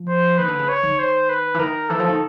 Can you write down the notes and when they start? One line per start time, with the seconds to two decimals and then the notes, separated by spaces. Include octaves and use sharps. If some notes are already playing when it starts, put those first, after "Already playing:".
Already playing: F3
0.08 C5
0.38 D#3 B4
0.48 D3
0.59 C#3
0.69 C#5
0.83 D#3
0.99 C5
1.29 B4
1.54 E3
1.59 D#3 A#4
1.89 E3 A4
1.99 F3
2.09 D#3